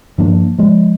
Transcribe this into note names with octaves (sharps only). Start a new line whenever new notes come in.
G2 F3 A#3 D4
F3 G#3